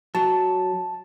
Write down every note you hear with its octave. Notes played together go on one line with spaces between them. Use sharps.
F#3 A5